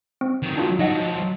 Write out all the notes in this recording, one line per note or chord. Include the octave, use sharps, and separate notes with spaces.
C4
D#3 F#3
D4 F4 F#4
F3 F#3 D#4 D#5 F#5